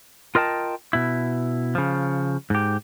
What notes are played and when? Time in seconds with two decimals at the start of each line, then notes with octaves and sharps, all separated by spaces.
0.35 F4 A#4 D#5 G5 A5
0.93 B2 E4
1.75 C#3 F3
2.50 G#2 G4